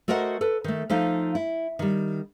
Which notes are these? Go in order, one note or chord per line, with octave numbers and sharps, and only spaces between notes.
A3 F#4 A#4 C5 D#5 F#5
A4 B4
D#3 A3
F3 A3 D#4 F5
E4
D#3 G3